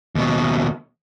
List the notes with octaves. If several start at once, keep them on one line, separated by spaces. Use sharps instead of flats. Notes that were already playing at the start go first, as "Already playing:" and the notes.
D#2 B2